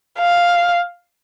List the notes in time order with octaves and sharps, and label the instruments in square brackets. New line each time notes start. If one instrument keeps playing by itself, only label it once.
[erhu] F5